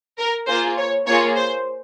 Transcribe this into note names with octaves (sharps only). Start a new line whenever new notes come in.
A#4
A#3 F4 G#4 C5
C#5
A#3 F4 G#4 C#5
C5